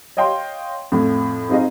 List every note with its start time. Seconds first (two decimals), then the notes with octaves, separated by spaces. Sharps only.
0.17 C#5 D#5 F5 G5 C6
0.92 F2 A2 F3
1.49 C4 D#4 F4 G#4 D#5